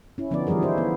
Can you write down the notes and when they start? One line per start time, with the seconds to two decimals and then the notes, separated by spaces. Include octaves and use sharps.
0.18 C#4 E4
0.31 D3 F3 B3 C#4 D#4 D5
0.47 E3 F3 G3 G#4 A#4
0.62 D#4 E4 C5
0.78 B3